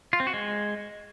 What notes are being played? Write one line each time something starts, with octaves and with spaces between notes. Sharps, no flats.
F4
C4
F#4
G#3